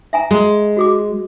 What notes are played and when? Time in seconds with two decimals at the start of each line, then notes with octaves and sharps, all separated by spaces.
0.13 E5 G#5 A#5
0.31 G#3 D#5 A#5
0.77 F#4 G#4 D6